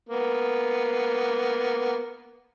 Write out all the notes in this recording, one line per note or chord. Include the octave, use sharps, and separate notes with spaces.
A#3 B3